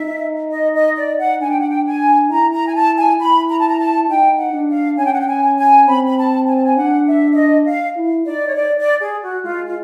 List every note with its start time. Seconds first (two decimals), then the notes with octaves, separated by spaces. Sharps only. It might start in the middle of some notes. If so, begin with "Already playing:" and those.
Already playing: D#4 E5
0.51 D#5
0.74 D#5
0.96 D5
1.18 F#5
1.41 D4 G#5
1.50 G5
1.59 F#5
1.69 G5
1.86 G#5
2.30 E4 A#5
2.52 A#5
2.66 G#5
2.75 A5
2.97 G#5
3.20 E4 B5
3.49 A#5
3.58 A5
3.68 A#5
3.79 A5
4.09 D#4 G5
4.39 F#5
4.53 D4
4.68 F5
4.98 C#4 G#5
5.05 G5
5.13 F#5
5.20 G5
5.28 G#5
5.58 G#5
5.87 C4 B5
6.07 B5
6.18 A5
6.47 G#5
6.56 A5
6.64 G#5
6.77 D4 F#5
7.07 E5
7.31 E5
7.36 D#5
7.66 F5
7.97 E4
8.26 D#4 D5
8.47 C#5
8.55 D5
8.78 D5
9.00 G#4
9.23 F#4
9.45 G#3 F4
9.66 F4